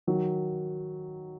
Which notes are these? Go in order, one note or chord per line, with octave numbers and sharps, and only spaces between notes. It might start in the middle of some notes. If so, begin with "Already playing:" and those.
D#3 F#3